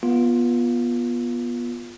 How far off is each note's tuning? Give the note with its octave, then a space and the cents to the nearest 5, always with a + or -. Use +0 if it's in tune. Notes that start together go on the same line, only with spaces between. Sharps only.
B3 -25 F4 +0